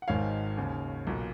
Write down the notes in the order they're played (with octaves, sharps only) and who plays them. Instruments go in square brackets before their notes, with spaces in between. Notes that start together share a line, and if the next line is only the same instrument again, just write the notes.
[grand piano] F#5
G#1 G#2 D#3 C#5 F5
D#2 C#3
B1 A#2